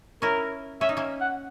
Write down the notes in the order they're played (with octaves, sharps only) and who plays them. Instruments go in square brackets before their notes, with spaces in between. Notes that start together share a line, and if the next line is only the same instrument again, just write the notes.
[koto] C#4 E4 [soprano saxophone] A#4
[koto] C#4 [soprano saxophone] E5
[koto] D#4
A#3 C#4
[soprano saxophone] F#5